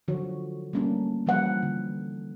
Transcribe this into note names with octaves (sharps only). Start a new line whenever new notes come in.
D3 F3 F#3 F#4 C#5
G3 A3 A#3 C#4 D4
E3 F3 G3 A#3 B4 F#5
D3